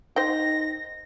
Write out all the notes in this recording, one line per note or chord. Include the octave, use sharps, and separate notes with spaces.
D#4 C5 G5 A#6